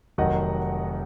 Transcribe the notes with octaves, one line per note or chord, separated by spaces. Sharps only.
F1 F2 D#3 F#3 D#5 F#5